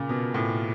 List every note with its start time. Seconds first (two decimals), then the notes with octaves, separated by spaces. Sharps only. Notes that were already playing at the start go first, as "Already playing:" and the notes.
Already playing: A#2 C#3
0.09 B2
0.34 A2